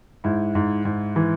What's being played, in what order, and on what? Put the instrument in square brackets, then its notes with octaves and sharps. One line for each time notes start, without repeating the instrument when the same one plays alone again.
[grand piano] G#2 E4
G#2
G#2
E3